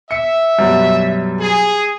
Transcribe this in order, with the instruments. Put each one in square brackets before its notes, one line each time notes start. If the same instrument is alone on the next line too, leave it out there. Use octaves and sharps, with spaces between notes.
[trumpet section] E5 [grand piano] C#7
[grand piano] F#2 B2 G3
[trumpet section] G#4